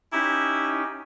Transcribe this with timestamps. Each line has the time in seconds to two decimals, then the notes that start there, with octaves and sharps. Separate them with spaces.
0.13 C#4 D#4 E4 G4